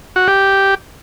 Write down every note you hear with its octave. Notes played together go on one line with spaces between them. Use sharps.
F#4
G4